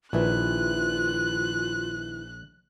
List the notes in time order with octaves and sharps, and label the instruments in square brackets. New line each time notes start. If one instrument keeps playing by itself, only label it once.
[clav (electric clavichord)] A#1 [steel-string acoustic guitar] D#3 E4 B4 [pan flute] F4 [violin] F#6